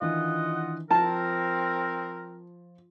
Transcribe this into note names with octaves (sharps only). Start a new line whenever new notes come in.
D#3 E3 D4 F4 D#5 F#5
F3 C4 A#4 A5